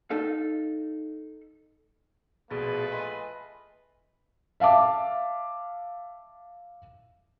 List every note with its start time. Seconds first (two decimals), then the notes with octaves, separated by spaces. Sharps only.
0.10 D#4 A4 F5
2.51 A#1 B2 A3 F4 G#4 B4 A6
2.92 D#5 G#5 B5 C6
4.60 E5 F5 A5 D6